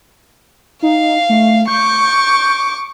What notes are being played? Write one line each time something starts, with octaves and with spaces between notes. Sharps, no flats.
D#4 F5
A3
C#6 D6 G6